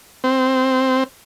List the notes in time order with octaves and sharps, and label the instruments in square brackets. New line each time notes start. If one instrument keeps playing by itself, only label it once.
[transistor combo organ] C4